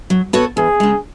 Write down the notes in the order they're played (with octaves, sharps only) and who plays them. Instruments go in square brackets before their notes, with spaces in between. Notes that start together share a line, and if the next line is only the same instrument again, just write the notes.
[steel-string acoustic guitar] F#3
B3 F#4 A4 C#5
[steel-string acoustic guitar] E2 [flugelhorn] G#4
[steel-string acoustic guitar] C#3 G#3